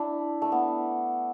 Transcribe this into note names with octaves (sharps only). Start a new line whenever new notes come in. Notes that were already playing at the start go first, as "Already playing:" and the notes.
Already playing: D4 E4
A3
B3